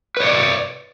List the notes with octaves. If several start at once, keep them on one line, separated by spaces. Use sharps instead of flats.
B4 C#5 D5